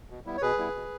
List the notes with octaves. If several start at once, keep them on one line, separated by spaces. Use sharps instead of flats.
B2
G3 B3 E4
C#5
B2 G#4 B4
G3 B3 E4
B2